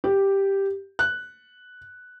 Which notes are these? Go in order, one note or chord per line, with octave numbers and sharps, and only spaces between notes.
G4
F#6